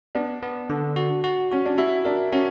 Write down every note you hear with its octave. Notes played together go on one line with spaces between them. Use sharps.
B3 D4
B3
D3
F#4
F#4
C#4 F#4
D4
E4 F#4
D4 A#4
C#4 F#4